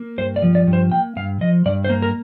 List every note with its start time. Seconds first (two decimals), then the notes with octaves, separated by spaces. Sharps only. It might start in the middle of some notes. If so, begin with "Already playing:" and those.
Already playing: A#3
0.18 G2 C5
0.36 D5
0.42 F3
0.55 D5
0.67 G2
0.73 C5
0.92 A#3 G5
1.16 G2 F5
1.41 F3 D#5
1.66 G2 D5
1.85 C5
1.89 A#3
2.02 A#4